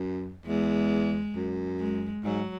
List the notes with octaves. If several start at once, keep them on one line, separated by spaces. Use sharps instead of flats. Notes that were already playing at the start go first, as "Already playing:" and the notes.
Already playing: F#2
E2 G#3
F#2
G#3
G#2 F#3